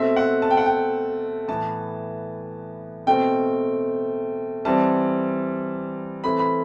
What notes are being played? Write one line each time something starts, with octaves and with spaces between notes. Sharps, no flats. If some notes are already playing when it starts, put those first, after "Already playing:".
Already playing: B2 A3 C4 E5
F#5
A5
G5
F#5
G5
A2 E3 B3 A5
B2 A3 C4 G5
E3 G3 C4 A5
E3 A3 C4 B5
B5